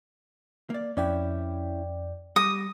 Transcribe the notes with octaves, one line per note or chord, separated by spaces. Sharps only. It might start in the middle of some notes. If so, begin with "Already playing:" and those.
A#3 D5
F2 C#4 E4 B4 D5 G5
G3 D6 D#6 A#6